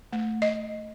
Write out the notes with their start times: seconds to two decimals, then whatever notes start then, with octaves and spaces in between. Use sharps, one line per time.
0.13 A3
0.42 D#5